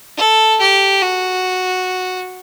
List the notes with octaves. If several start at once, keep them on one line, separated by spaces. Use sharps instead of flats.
A4
G4
F#4